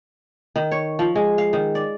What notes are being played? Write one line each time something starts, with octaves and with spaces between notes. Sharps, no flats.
D#3
C#5
F3
G#3
F5
D#3
D5